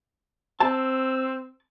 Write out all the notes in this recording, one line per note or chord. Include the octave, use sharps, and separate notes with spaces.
C4 A5 E6